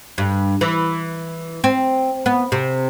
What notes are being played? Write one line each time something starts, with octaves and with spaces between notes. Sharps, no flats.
G2
E3
C4
B3
C3